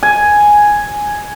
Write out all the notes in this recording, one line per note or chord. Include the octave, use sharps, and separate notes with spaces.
G#5